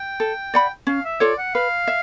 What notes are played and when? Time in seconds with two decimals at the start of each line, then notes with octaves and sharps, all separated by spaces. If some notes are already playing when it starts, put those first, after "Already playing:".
Already playing: G5
0.20 A4
0.54 D5 F#5 B5
0.87 C#4 F5
1.04 E5
1.20 F4 A4 C#5 D5
1.38 F#5
1.54 B4 F5
1.88 E5